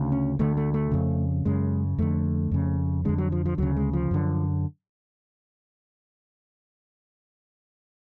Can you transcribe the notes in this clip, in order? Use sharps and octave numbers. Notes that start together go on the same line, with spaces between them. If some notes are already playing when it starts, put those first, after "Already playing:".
Already playing: D2 C#3
C#4
D2 D3 A3
A3
A3
F2 C#3
F#2 C#3 G#3
F2 D3 A3
F2 C#3
F2 D3 G#3
F#3
F3
F3
D2 C#3 F#3
G#3
F3
F#2 D3